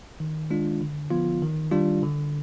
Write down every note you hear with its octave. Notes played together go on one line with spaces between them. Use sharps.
D#3
G#3 D4 F4
D3
F3 B3 F4
D#3
G3 D4 F4
D3